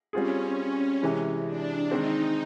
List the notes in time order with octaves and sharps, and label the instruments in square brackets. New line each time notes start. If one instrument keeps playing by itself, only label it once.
[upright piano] G3 C4 F4 G#4 [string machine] C#4
[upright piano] C3 E3 G#3
[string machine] D4
[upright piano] D#3 G#3 C4 [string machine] D#4